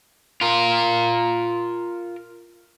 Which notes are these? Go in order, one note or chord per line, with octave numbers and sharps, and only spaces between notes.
F4 A#4